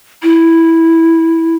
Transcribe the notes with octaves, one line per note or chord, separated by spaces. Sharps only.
E4